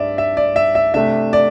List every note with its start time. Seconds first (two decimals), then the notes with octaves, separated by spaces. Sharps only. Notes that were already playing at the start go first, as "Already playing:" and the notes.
Already playing: G2 G3 D4 D5 E5
0.18 E5
0.37 D5
0.56 E5
0.75 E5
0.94 C3 A3 D4 E5
1.33 D5